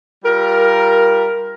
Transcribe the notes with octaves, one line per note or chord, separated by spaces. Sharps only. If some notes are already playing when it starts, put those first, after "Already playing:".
G3 F4 A#4